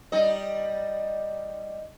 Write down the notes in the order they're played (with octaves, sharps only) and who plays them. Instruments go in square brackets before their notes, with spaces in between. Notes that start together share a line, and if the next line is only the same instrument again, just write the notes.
[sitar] G3 D#4 D#5